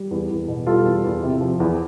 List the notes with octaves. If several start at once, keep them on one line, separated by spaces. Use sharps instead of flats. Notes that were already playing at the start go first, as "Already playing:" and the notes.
Already playing: G3
E2
E2
B2
G3 F4 A4
E2
E2
C3
F3
E2